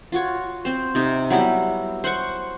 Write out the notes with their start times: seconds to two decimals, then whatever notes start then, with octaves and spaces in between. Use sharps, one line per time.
0.12 F4 F#4 C#5
0.65 C4 C5
0.95 C3 D#4
1.30 F#3 G3 B3 E4
2.04 C5 F#5 C6 C#6